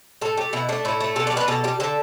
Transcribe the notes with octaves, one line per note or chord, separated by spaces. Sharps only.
A2 A4
A3 G4
B2 E4
A3 D4
A2 E4
A3
B2 A4
D5
G3
B4
B2 A4
G3 G4
D3 A4